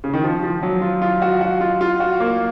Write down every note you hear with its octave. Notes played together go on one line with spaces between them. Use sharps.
C#3
D#3
F3
F3
F#3
F4
F4
F#4
F#4
F4
F4
F#4
A#3